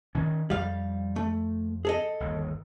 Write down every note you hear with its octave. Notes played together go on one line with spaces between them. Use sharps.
D#3 C#4
F2 G3 F5
A3
G#4 A4 D#5
G1 D#2